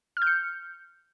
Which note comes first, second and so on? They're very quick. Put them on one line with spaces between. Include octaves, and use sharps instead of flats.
F6 G6 C#7